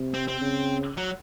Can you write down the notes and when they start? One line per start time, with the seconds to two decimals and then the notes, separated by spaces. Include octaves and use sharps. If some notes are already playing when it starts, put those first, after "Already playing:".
Already playing: C3
0.14 C4
0.28 C4
0.41 C#3
0.97 F#3